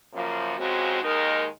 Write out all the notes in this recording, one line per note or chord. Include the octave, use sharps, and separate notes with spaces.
F#2 C#3 F3 A#3
F2 C#3 G#3 C4 F#4
D#2 D#3 G#3 D#4 A#4